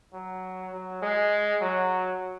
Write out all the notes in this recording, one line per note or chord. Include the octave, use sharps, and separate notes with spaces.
F#3
F#3
G#3
F#3